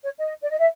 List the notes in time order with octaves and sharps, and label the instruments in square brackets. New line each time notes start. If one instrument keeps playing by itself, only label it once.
[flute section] C#5
D#5
D5
D#5
E5